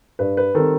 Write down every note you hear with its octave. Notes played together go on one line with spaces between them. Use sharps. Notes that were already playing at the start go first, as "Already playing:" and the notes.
G2 B4
B4
D#3 G3 C4 A4